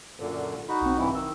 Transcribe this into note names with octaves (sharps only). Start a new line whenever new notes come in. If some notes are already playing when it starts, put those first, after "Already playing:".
F#2 A#2 D3
D#4 F#4 B5
B1 C4
G2 E3 E4
D#3 E6